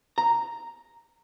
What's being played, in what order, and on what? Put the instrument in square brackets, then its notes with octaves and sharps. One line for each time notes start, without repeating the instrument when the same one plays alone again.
[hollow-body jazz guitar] A#5